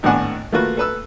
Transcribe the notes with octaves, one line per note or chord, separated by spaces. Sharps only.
G#1 A2 B3 D4 F#5 G#5
A3 A#3 F4 F#4 B4
A4 B4 E6